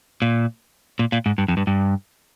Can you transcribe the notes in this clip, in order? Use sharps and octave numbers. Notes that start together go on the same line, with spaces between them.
A#2
A#2
A#2
G#2
G2
F2
G2
G2